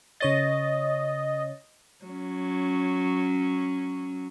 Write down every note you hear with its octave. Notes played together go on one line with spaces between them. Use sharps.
C#3 C#5 D#5 A6
F#3 C#4